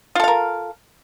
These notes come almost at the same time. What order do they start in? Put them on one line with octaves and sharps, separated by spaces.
F4 A4 F5 A#4